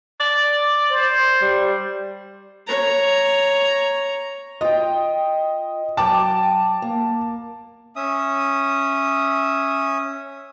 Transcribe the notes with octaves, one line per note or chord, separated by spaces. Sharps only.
D5
C5
G3
C#5 A#5
F4 D#5 G5
F#3 G5 A5 D6
A#3
C#4 E5 D#6